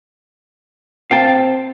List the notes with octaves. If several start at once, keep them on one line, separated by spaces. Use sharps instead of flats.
C4 F5 G5 A5